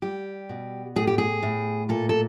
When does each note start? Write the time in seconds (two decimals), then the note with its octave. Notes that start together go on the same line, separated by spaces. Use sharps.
0.02 G3 G4
0.49 B2
0.96 A2 G#4
1.07 G4
1.18 G#4
1.43 A2
1.89 A#2 A4
2.09 A4